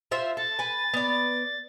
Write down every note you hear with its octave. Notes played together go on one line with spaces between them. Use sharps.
F4 C5 E5
A4 A6
B4 G#5
B3 D5